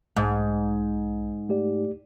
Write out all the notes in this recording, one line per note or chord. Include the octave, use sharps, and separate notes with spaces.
B1 G#2
A3 G4 D5